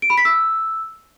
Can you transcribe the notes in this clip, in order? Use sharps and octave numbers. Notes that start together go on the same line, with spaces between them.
D7
B5
B6
E6